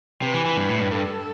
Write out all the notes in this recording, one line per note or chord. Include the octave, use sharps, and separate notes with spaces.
C3 B4
E3
E3
G2
A2
G2
G2 A4